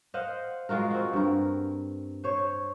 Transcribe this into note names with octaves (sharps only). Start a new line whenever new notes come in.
C5 D#5 F5 F#5
G#3 F4 F#4 A#4
C4 F#4
G2 A#4
C5 C#5